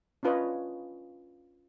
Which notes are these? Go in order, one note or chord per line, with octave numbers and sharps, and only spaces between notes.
C#4 D4 F4 B4 C#5 D#5